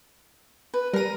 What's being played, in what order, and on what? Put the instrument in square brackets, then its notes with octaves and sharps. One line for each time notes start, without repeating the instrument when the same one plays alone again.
[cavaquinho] B4
[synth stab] G3 D#7 [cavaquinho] A#4 A#5